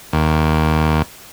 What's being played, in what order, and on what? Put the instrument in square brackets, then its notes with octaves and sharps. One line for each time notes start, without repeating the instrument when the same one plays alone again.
[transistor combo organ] D#2